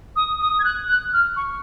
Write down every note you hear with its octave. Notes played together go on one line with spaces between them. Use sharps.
D#6
D#6
G#6
F#6
F#6
F6
C#6